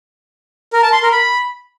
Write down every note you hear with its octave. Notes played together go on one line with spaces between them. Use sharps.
A#4
A5
C6
A#4
B5